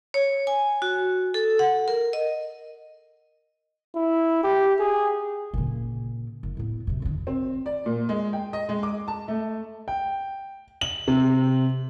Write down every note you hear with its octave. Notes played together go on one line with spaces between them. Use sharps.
C#5
G#5
F#4
A4
F#5
A#4
D#5
E4
G4
G#4
A#2 C#3
F#1
A2 B3
F#2 C3
C#2 D#3
C4
D5
A#2
G#3
G5
D#5
G#3
D6
A5
A3
G5
F#7
C3